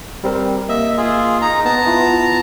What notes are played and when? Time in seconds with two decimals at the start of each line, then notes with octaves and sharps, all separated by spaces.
0.24 G3 C4 A#4
0.69 A#3 D#5 E5
0.97 F4 G#4
1.42 D#4 A#5
1.65 B3 A5 A#5
1.85 B3 E4 F4